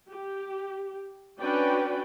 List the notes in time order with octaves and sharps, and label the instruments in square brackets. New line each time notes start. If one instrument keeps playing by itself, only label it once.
[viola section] G4
C#4 D4 F#4 B4 D5 G5